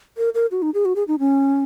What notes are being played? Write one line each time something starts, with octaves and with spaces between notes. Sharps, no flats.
A#4
A#4
F#4
D#4
G#4
F#4
G#4
D#4
C#4